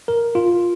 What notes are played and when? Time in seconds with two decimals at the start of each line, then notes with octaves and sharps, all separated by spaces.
0.08 A#4
0.35 F4